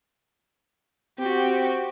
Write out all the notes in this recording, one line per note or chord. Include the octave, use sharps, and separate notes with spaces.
C4 F#4 G4